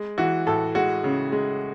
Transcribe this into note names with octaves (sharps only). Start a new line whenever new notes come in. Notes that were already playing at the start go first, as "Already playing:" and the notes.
Already playing: G#3
E3 F#4
A2 A4
G#3 F#4
C#3
G#3